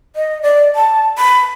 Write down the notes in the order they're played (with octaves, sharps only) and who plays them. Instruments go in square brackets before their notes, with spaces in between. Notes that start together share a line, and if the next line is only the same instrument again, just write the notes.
[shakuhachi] D#5
D5
A5
B5